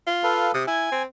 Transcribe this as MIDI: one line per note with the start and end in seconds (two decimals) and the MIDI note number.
0.07 0.49 65
0.23 0.52 69
0.23 0.52 71
0.23 0.52 77
0.54 0.64 48
0.54 0.63 87
0.68 0.89 64
0.68 1.02 80
0.92 1.05 60